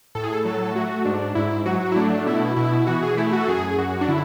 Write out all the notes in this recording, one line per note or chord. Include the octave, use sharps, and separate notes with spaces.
A2 A4
G#4
A4
F#3 A4
A3 F#4
G#2 D4
G#2 E4
F#3 F#4
E4
A3 D4
B2 E4
B2 E4
E3 F#4
G#4
A3 E4
F#4
A4
F#2 G#4
F#2 F#4
D4
D3 E4